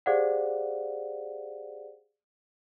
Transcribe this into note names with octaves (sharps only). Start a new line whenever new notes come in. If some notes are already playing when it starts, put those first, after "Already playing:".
G4 G#4 C5 D5 F5 F#5